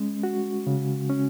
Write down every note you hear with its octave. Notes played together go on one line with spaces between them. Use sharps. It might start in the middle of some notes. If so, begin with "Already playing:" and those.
Already playing: G#3 C#4
F#4
C#3
C#4